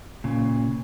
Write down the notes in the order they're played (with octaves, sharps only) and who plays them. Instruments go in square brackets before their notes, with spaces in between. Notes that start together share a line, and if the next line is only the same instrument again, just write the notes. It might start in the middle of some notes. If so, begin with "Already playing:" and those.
[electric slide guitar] A#2 C#3